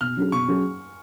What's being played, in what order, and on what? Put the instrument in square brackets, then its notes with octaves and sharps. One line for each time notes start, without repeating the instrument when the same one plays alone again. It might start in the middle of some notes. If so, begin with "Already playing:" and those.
[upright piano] B2 [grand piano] F6
[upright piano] F#3 C#4 G#4
[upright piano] B2 [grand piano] C#6
[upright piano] F#3 C#4 G#4